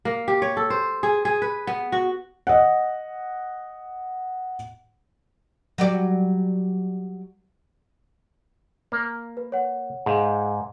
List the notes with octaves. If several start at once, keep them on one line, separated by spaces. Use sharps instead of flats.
A#3
G4
C#5
A4
C5
G#4
G#4
B4
B3
F#4
D#5 F#5
F#3 G3 D5
A#3
B4
C#5 F#5
G#2 G#4 F5